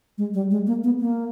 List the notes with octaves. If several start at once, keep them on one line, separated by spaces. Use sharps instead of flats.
G#3
G3
G#3
A#3
B3
A#3